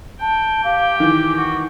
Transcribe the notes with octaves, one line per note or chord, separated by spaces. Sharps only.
G5 A5
G4 F5
D#3 E3 D6
F#4